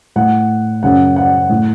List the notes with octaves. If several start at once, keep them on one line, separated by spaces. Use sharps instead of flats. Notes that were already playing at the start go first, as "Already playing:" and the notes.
A2 F#5
F#2 C#3 F#5
F#5
A2